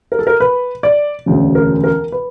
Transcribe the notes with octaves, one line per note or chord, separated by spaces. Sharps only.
A#4
A4
A#4
B4
D5
E1 D2 C#3
A#4
A#4
B4